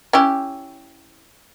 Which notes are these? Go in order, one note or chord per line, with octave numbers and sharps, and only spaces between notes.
C#4 E4 G4